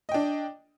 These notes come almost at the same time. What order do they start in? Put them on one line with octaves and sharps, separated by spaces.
D#5 G5 D4